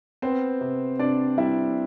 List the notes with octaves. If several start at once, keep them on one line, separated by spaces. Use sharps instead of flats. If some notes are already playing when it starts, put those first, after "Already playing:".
B3 C4 C5
C3
C3 D4 D5
G3 E4 E5